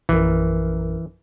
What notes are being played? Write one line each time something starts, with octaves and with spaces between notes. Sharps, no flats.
A#1 F#2 E3 A#4